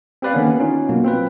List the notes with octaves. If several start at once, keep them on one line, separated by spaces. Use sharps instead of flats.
C4 G4 B4 D5 F5
D3 D#3 A#3 B3 C#4
C#4 D#4 F4
B2 F#3 A#3
C4 F4 B4